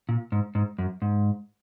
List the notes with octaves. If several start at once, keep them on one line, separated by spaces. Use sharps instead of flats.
A#2
G#2
G#2
F#2
G#2